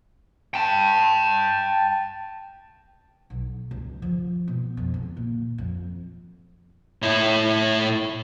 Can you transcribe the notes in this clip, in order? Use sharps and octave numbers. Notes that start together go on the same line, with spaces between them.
G5 A5
B1
C#2
F3
B2
F2
C#2
A#2
F2
A2 E4